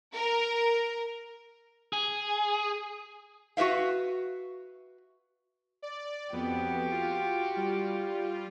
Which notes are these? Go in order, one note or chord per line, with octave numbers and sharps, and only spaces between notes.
A#4
G#4
F#4 G4 B4 E5 F5
D5
F2 B3 F#4 G4
F4
G3 F4